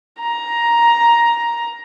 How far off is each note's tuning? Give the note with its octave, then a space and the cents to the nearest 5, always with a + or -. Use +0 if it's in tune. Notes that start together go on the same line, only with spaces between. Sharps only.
A#5 +10